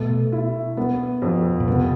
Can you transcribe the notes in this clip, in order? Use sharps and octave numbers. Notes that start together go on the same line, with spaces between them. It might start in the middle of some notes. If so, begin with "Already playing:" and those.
Already playing: B2 A3
E4
B3
F2
B2
C3 B3